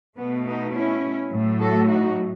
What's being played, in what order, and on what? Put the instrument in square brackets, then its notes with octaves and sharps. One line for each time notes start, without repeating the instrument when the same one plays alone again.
[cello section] B2 A3 B3
B3 D#4
C#4 E4
A2 F#3 A3
F#4 A4
D#4 F#4